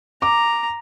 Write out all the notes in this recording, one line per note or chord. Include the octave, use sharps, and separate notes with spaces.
A#5 D6